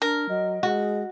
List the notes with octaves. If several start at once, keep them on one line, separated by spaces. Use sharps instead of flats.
D4 A#4
F#3 D#5
G#3 F#4